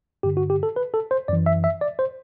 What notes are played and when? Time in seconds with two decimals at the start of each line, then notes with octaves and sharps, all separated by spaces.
0.23 G2 D3 G4
0.37 F#4
0.50 G4
0.63 A4
0.76 B4
0.94 A4
1.11 C5
1.28 F#2 E3 D5
1.46 E5
1.64 E5
1.81 D5
1.99 C5